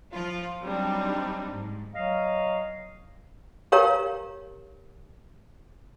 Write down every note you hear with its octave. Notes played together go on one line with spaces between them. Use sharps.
F3 F4
F#3 G3 C4 D4 D#4
G#2
F#3 D#5 F5
G4 A#4 C#5 F5 A#5